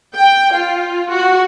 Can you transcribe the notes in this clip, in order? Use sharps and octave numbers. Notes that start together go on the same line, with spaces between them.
G5
F4
F#4